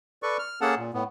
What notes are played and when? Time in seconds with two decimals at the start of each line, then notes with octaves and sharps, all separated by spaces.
0.23 A4 B4 D5 C#6
0.39 F6
0.61 A#3 C#4 G#4 A4 F#5 A5
0.78 A#2
0.94 A2 B3